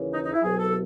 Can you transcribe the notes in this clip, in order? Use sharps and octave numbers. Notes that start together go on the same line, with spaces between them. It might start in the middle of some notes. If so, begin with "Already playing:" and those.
Already playing: D#2 C#3 E3
D#4
D#4
E4
C2 B2 F#3 G#4
A4